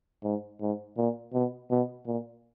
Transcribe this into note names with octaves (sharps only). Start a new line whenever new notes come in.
G#2
G#2
A#2
B2
B2
A#2